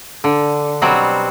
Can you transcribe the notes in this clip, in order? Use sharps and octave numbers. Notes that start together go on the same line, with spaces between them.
D3
B2 F#3 G3 C4 F#4